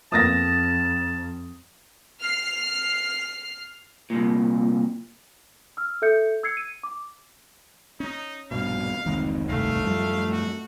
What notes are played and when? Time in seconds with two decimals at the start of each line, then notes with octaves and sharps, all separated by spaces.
0.12 F2 F3 A#3 B3 A5 D#6 A6 A#6
2.21 F6 C7
4.10 C2 A#2
5.77 E6 F6
6.02 A4 E5 G6 C#7
6.43 E6 G#6 C7 C#7
6.57 D#7
6.83 D6
8.00 C#4 D#4
8.51 A#1 G2 B2 F5
9.06 F1 C#2 D#3 E3 G#3 C4
9.50 B1 G2 C3 A3 F5
9.84 F#2 A2 F3 G3
10.32 F#4